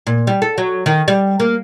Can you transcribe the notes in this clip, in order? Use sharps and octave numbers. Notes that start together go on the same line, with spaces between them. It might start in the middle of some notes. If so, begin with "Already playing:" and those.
A#2
G3
A4
F#3
D#3
G3
A#3